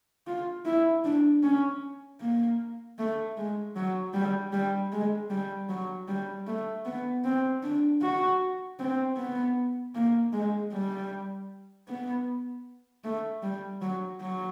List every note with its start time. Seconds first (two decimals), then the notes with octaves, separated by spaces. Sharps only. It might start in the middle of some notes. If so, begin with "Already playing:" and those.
0.27 F4
0.66 E4
1.05 D4
1.43 C#4
2.21 A#3
2.99 A3
3.37 G#3
3.76 F#3
4.14 G3
4.52 G3
4.92 G#3
5.30 G3
5.69 F#3
6.08 G3
6.47 A3
6.85 B3
7.24 C4
7.63 D4
8.02 F#4
8.79 C4
9.17 B3
9.95 A#3
10.33 G#3
10.73 G3
11.88 B3
13.04 A3
13.43 G3
13.82 F#3
14.21 F#3